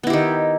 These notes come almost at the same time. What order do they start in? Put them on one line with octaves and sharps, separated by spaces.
B3 E4 G4 D#3